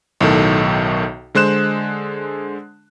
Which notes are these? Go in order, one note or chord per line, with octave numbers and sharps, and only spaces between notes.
B1 A2 D#3 A4
D3 G#3 C5 F#6 E7